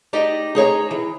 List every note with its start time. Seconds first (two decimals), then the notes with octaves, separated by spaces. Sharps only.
0.13 D#4 G4 D5 D#5
0.55 D#4 G#4 C#5 A#5
0.91 E3